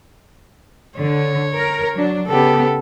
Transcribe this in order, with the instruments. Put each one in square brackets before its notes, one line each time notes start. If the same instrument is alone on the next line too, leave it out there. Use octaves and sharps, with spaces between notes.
[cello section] D3 [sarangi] C#5
[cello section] A#4
F#3 D4
[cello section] C#3 B3 G4 [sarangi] A4